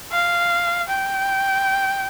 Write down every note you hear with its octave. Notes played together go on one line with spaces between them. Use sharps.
F5
G5